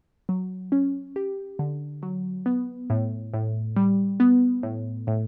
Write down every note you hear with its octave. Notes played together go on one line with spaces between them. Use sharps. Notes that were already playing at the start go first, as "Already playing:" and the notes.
F#3
C#4
G4
D3
F#3
B3
A2
A2
G3
B3
A2
A2